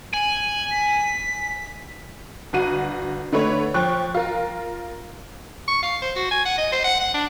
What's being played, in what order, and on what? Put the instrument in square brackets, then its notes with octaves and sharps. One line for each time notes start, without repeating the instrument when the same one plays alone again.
[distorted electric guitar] G#5 [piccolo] F#7
[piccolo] B6
[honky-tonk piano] G1 F#4 D#7
D3 A3 B4 C#5
F3 G5 C#6 F#6
F4 A#4
[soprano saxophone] C#6
F5
C5
F#4
G#5
F#5
D#5
C5
F#5
F#5
D4